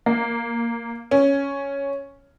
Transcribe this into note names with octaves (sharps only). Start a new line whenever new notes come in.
A#3
C#4